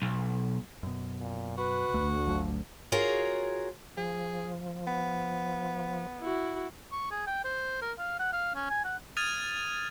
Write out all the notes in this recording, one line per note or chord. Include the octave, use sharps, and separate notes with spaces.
B1
F#2 B2
A#2
F#4 B4
D2 A3
G1 F3 F#3
F4 F#4 G#4 A#4 C#5 F5
F3 G#4
B3
E4 F#4
C#6
G#4
G5
C5
A#4
F5
F#5
F5
C#4
G#5
F#5
D#6 F6 G#6 A6 D#7 F7